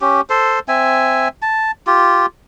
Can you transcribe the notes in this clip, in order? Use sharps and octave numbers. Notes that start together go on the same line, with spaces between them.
C#4 G4
A4 C5
C4 E5 G#5
A5
F4 G4